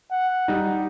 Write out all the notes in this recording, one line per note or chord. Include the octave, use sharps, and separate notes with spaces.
F#5
G3 D#4